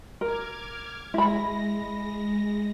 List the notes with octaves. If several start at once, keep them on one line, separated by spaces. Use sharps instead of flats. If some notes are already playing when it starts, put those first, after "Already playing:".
A#4 D6 F6 G#6
G#3 E4 B5 A#6